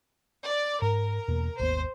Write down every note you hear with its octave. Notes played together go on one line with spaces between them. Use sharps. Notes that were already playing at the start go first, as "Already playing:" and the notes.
D5
G#2 A#4
E2 B2 A#3
G#1 D#2 B3 C5